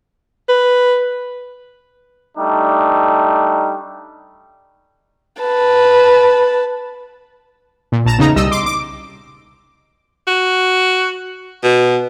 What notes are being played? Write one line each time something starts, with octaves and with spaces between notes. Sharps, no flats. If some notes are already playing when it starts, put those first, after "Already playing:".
B4
G3 A3 D4 D#4
B4 A5
A#2
A#1 A5 A#5 E7
E2 C#3 D#4 A#5
C2 G3 D#5 E6
C6 D6
D6
F#4
B2